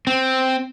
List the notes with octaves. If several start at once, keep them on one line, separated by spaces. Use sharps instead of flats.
C4